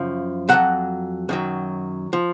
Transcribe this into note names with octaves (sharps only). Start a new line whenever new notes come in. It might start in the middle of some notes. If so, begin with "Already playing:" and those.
Already playing: F#2 C#3 F3
F2 C#3 F#3 F#5
F#2 D#3 F#3
F3